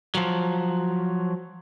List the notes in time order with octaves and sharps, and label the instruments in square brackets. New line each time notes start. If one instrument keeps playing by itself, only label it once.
[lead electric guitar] F3 F#3